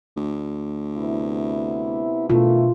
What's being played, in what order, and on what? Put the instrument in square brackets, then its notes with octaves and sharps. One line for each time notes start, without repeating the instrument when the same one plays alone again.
[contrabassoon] D2
[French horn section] C3 B3 E4
[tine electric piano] B2 D4 [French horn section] D#3 E3 A3 [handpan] F4